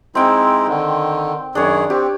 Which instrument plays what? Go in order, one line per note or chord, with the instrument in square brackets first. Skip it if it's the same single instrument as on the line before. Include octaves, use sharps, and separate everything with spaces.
[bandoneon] G#3 D#4 E4 [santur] C4 G5
[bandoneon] D3 D#3
[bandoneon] F#2 D#3 G#4 [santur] D4 C#5
[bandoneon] C4 [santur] G4